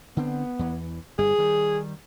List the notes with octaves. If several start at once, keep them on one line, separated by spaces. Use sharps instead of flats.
D3 B3 C4
E2 E3
G1 G2 G3 G#4
D#3 G3